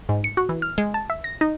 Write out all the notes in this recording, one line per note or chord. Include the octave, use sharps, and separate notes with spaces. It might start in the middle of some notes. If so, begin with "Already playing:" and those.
G#2
C#7
F#4
E3
F6
G#3
A5
E5
A#6
D#4